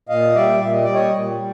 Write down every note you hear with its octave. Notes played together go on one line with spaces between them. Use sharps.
A#2 D#5 F5
G3 D5 E5
A#2 E5
D#5
G3 D5
C#5 D#5
A#2
G3